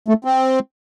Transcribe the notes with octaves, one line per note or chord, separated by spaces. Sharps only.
A3
C4